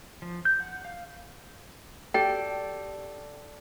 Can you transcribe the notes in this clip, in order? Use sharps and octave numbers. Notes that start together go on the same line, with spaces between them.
F3
G6
F#5
F5
G4 A4 D5 G5